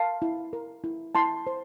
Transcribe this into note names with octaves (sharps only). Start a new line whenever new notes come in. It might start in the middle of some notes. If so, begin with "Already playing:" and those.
Already playing: A#4 F5 A5
E4
A#4
E4
E4 A5 C6
C5